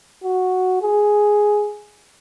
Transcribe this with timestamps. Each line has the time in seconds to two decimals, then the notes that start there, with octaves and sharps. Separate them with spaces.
0.24 F#4
0.82 G#4